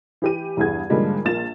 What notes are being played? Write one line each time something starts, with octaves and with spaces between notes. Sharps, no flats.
E3 G4 D#7
E2 G2 E3 G#4 F#5 G#6
G#2 D3 F3 G3 G#3 A#3
A#1 A#3 F4 A6 E7